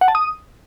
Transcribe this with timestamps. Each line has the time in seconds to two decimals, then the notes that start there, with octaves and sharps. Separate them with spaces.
0.01 F#5
0.08 A5
0.15 D#6